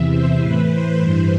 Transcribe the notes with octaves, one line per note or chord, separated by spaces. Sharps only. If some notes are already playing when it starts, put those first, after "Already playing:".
Already playing: E2 C3 E3 E5
C5
A2 E3 B4
C5
G2 E3 C5